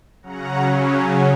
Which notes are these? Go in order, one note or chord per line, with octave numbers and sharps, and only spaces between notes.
C#3 F#3 C#4 F#5 A#5